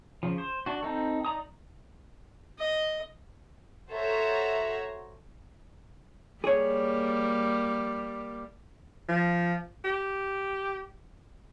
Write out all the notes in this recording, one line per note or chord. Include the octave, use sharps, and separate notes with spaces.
C#3 F3
C5
D4 F#4
C4 D#4 A4
D#4 D5 A#5 D#6
D#5
F#4 A4 C5 C#5 E5 A#5
G3 A#3 G#4 C#5
F3
G4